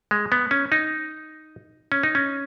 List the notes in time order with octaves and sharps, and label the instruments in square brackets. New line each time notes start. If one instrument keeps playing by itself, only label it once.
[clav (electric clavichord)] G#3
B3
C#4
D#4
C#4
D#4
C#4